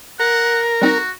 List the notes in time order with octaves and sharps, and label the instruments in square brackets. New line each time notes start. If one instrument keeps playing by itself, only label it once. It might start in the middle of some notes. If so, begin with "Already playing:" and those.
[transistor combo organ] A#4 [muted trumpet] F#5
[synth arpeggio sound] G3 C4 D#4 [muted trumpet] F#4